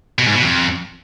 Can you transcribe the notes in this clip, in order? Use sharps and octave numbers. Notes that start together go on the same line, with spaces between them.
B2
G#2
B2
F2